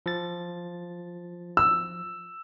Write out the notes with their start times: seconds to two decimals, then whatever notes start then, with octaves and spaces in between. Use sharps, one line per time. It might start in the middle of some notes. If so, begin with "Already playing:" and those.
0.06 F3 A6
1.57 E6